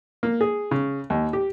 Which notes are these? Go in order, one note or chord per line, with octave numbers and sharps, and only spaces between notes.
A#3
G#4
C#3
D#2
G4